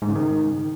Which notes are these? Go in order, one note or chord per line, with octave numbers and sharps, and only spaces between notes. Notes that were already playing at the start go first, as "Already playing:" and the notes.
G#2
C#3
D#3